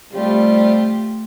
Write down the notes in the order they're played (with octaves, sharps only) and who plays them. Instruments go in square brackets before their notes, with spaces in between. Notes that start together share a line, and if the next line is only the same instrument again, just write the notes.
[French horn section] C3 F3 G3 [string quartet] A3 F4 G4